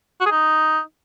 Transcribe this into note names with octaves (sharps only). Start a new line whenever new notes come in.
F#4
G#4
D#4